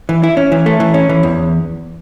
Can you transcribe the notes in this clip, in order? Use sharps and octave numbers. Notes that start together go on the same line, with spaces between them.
E3
E4
C#4
E3
A3
E3
C#4
E3
E2